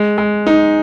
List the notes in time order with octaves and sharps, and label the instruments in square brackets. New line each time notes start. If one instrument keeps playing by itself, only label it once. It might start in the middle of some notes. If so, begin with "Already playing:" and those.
Already playing: [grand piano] G#3
G#3
D#4